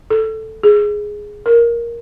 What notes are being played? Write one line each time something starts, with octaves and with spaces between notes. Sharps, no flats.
A4
G#4
A#4